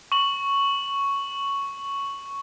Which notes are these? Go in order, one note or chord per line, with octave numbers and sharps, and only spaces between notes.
C#6 F#7